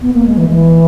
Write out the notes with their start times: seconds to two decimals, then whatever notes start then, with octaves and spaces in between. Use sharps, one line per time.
0.02 B3
0.14 A#3
0.26 G#3
0.38 E3
0.50 E3